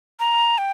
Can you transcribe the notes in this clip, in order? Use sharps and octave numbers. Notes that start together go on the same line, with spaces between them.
A#5
G5